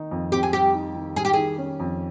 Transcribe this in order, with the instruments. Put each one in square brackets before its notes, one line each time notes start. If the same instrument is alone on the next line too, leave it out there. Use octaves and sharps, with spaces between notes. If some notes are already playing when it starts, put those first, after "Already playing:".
Already playing: [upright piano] D#3 D#4
F2
[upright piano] C4 [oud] G4
[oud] G#4
[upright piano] G3 [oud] G4
[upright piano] D#4
D#3
[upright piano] G3 [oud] G#4
[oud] G4
[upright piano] D#3 [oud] G#4
[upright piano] C#4
F2